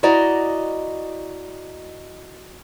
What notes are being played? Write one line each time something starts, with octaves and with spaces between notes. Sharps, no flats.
E4 F#4 D5 D#5 A#5